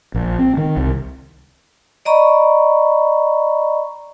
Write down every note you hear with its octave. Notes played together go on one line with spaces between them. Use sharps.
A#1
C4
D#3
C2
D5 D#5 A#5 B5 C#6